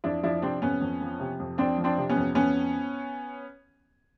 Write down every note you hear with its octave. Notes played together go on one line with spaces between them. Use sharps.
F2 D4 E4
F3 D4 E4
C3 C4 D4
F2 B3 C#4
F2
F3
C3
F2
F2 C4 D4
F3
C4 D4
C3
B3 C#4
F2
F2 B3 C#4